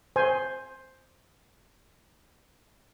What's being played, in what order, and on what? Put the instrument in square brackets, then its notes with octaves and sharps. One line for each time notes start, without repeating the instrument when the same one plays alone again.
[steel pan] C5 G#5